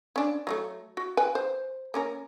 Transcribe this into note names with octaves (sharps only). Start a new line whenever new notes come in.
C#4 D4
F#3 G#3 A3
F#4
B4 G5 G#5
C5
A#3 C#4 A#4